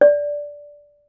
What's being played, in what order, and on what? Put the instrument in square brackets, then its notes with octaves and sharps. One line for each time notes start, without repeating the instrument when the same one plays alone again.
[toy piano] D5